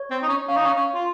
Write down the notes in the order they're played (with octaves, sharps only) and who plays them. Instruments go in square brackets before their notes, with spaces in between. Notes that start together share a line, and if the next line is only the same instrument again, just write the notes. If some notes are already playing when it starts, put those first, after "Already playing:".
Already playing: [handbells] C#5
[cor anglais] C4
D#4
C#4
[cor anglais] C#4 [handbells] F5
[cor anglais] D#4
C#4
C#4
F4